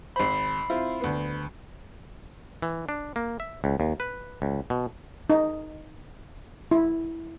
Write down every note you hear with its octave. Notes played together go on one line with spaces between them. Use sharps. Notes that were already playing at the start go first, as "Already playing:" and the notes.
G#1 C5 B5 C7
C4 E4 F4
D2 B3
E3
D4
A#3
E5
C#2
D#2
B4
C#2
B2
D#4
E4